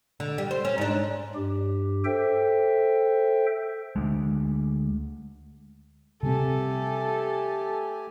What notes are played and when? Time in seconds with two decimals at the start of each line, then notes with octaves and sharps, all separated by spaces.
0.20 D3
0.38 G3
0.51 C5
0.65 C#4
0.78 G#2 D4
1.35 G2 G4
2.05 A4 C5 E5 G5
3.96 D2 G#3
6.23 C3 G3 A3 C4 G4 A4 G#5